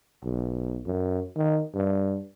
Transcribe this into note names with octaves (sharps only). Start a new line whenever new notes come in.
B1
F#2
D#3
G2